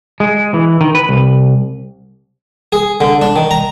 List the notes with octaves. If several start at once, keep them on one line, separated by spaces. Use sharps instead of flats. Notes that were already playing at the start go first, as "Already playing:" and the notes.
G#3
E3
D#3
B4
C2
G#4
D3
D4
D#3
A#5